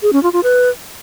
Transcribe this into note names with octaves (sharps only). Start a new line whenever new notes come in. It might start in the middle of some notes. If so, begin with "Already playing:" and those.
G#4
C#4
F4
F4
B4